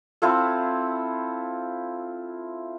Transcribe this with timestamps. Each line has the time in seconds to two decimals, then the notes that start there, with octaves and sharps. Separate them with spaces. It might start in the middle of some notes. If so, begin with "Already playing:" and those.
0.22 C4 E4 F4 A4